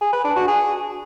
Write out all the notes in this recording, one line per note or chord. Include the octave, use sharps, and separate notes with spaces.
G#4
B4
D4
F#4
G#4